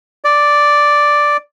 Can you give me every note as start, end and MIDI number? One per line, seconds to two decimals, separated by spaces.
0.24 1.37 74